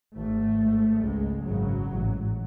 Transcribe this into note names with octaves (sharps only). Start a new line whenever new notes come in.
G#1 G#2 A3
G#1 G#2
C#2 C#3 G#3
G#1 F#2 C#3 F#3
A1 G#2